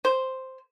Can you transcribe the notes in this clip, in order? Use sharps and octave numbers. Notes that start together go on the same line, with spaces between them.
C5